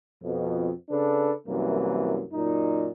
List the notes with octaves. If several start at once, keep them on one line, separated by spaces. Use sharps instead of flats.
F2 B2
C#3 D4 A4 B4
C2 F#2 E3 A#3
F#2 A#2 D#4